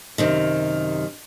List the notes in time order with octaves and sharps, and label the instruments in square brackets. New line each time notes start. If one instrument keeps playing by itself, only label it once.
[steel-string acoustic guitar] F#2 C3 D#3